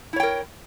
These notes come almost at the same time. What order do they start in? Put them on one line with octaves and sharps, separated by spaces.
E4 C#5 G5 A#4